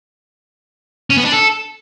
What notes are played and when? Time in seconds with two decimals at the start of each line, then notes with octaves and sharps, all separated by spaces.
1.10 C#4
1.17 B3
1.25 D4
1.32 A4